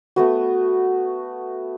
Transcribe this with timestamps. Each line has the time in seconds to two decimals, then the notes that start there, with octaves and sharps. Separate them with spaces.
0.16 A3 B3 F#4